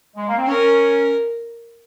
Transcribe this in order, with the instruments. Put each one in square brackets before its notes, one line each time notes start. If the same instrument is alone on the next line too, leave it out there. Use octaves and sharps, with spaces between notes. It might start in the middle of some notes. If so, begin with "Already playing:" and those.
[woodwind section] G#3
A#3
C4
[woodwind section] C#4 [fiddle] A#4